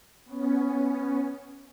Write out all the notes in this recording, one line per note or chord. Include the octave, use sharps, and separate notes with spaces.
B3 C#4